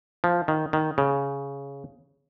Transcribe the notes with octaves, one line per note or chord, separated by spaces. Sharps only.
F3
D#3
D#3
C#3